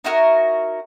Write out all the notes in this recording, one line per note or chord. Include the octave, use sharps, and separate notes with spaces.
D#4 E4 F#4 A#4